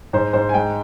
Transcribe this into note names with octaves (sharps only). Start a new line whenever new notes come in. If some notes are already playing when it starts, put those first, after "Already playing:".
G#2 C5
G#2 C5
G#5
G#3 G5